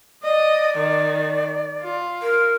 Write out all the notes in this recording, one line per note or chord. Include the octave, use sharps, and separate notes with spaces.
D5 D#5
D#3
F4
A#4